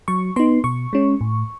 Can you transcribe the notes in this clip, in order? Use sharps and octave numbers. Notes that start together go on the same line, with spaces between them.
F#3 C#6
B3 D#4 C6
B2 C#6
G#3 C#4
A2